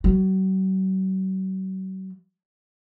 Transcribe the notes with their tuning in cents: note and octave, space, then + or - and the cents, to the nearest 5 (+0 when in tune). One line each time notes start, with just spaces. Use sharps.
F#3 +40